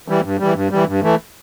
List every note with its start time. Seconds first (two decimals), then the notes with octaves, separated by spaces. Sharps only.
0.08 E3 G3
0.24 G2
0.40 E3 G3
0.55 G2
0.71 E3 G3
0.88 G2
1.03 E3 A3